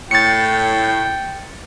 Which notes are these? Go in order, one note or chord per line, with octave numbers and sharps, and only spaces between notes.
A2 G5 A6 C#7